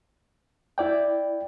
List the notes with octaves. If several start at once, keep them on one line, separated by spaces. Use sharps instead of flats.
E4 D5 G5